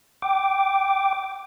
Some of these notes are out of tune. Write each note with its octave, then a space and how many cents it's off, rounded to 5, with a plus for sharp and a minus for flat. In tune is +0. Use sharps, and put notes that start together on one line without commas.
G5 -20 D6 +0